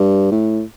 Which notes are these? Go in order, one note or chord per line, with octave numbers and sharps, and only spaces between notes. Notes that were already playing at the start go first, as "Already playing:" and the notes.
Already playing: G2
A2